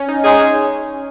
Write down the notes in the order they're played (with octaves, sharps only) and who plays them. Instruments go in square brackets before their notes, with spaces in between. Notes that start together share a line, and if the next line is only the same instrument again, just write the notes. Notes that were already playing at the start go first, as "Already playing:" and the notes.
Already playing: [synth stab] C#4
D#4
[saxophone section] G#3 D#4 G#4 [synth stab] C#4
[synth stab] C#4